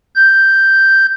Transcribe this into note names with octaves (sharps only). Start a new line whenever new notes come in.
G6